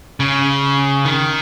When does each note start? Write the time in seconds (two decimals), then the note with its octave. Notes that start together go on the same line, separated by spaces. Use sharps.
0.20 C#3
1.05 D#3